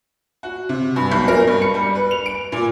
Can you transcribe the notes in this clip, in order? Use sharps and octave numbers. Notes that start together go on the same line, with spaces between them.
F#4
C3
G2
B1
A#4
G2
C#7
G3
B4
F7
D7
A#2